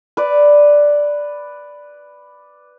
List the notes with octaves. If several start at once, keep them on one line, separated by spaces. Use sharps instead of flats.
B4 D5